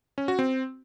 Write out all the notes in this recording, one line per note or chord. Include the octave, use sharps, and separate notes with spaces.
C#4
F#4
C4